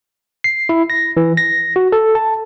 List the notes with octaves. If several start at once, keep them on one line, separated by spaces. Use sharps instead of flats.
C7
E4
A#6
E3
A#6
F#4
A4
A5